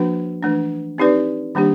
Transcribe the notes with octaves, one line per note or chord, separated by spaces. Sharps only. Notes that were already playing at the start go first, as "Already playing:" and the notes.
Already playing: F3 A#3 D4 F#4 B4
E3 A3 D4
C4 D#4 G4 B4 D5
D#3 G3 A#3 D4 G4